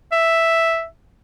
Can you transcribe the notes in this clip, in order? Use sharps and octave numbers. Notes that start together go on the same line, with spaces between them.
E5